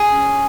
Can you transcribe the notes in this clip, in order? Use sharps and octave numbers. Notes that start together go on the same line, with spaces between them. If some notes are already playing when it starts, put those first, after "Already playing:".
Already playing: G#4
C#4